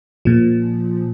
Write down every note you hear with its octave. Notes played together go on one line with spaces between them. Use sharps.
A#2 F3